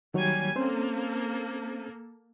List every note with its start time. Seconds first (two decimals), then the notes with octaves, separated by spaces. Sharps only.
0.14 D#3 F#3 G3 A#3 C#5 G#5
0.56 A#3 C4 C#4 A4 C5